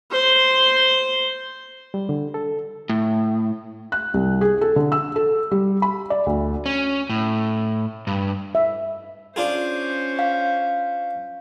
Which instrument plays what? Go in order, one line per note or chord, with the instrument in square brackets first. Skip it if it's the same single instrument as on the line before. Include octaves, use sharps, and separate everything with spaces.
[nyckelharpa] C5 C6
[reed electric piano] G3
D3
A4
[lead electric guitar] A2
[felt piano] F#6
C2
G#4
A4
D3
E6
A4
G3
B5
D5
D2
[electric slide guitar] C#4
A2
G2
[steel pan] E5
[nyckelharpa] C#4 C5 [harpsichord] D4 F4 G#4
[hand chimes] F5